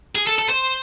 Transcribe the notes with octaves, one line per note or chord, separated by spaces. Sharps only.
G#4
A4
A4
C5